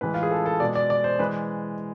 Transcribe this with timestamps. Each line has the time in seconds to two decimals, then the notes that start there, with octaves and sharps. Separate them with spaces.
0.01 A2 E3 G#3 B4
0.14 F4
0.23 G#4
0.31 A4
0.46 A4
0.60 B2 G#3 D5
0.75 D5
0.90 D5
1.04 C5
1.19 E3 G#3 B4